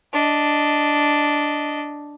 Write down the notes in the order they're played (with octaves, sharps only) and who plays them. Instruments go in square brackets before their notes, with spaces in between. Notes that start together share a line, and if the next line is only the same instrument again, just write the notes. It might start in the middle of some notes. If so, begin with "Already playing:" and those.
[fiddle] D4 D#5